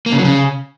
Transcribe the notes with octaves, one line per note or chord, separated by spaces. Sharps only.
A#3
C#3
F#3
C#3